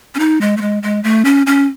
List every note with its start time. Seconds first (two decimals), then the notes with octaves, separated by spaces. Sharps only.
0.15 C#4
0.19 D#4
0.41 G#3
0.57 A3
0.61 G#3
0.83 G#3
1.04 A3
1.25 C#4
1.46 C#4